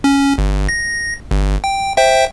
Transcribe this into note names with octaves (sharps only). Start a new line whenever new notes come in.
C#4
G1
A#6
G1
G5
C5 E5 G5